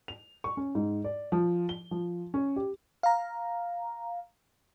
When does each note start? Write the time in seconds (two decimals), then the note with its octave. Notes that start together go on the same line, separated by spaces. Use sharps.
0.08 F7
0.44 C#6
0.57 C#4
0.75 G#2
1.04 D5
1.32 F3
1.69 G7
1.91 F3
2.34 C#4
2.56 G4
3.03 F5 A#5